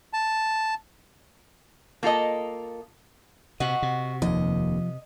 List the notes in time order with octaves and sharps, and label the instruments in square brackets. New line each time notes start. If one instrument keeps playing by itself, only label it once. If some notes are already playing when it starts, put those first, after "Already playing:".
[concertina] A5
[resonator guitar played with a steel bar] A#3 F4 A4 D#5
[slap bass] C3 [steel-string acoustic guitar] F#4 [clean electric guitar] D#5 F#5
[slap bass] C3
[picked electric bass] F1 D#2 [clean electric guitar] F3 [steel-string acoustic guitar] D#5